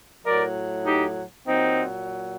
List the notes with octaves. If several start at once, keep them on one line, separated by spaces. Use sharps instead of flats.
A2 F#3 A#4 D5
D#4 G4
A#2 F#3 C4 D#4